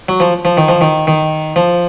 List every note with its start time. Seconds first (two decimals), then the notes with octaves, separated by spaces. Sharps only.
0.09 F#3
0.20 F3
0.45 F3
0.57 D#3
0.69 F3
0.81 D#3
1.07 D#3
1.56 F3